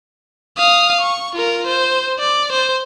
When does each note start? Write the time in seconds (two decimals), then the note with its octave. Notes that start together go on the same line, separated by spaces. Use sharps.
0.57 F5 D#6
1.01 C#6
1.35 F4 A#4
1.67 C5
2.19 D5
2.52 C5